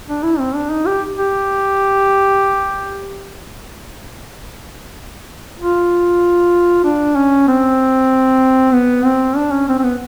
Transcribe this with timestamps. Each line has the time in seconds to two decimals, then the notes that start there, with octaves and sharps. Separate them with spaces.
0.08 D4
0.23 E4
0.39 C4
0.55 D4
0.71 D#4
0.86 G4
1.18 G4
5.59 F4
6.85 D4
7.16 C#4
7.48 C4
8.73 B3
9.05 C4
9.37 D4
9.52 C#4
9.69 C4
9.79 C4
9.84 B3